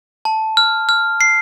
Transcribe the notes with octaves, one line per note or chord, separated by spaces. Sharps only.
A5
F6
F6
C7